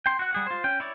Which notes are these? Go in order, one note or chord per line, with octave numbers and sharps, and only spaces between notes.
G5 C6
F#4 F#5
G3 G#4 F#5
F4 C5
C#4 G5
E4 C#5 D5